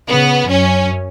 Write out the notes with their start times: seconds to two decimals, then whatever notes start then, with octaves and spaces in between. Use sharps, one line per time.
0.09 C#3 B3
0.49 F#2 C#4